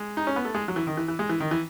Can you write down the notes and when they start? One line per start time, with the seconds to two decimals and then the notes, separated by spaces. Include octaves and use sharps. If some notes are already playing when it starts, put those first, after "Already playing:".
Already playing: G#3
0.17 D#4
0.27 C#4
0.36 B3
0.45 A3
0.55 G#3
0.68 F#3
0.76 E3
0.87 D#3
0.97 E3
1.08 E3
1.19 G#3
1.29 E3
1.40 D#3
1.51 E3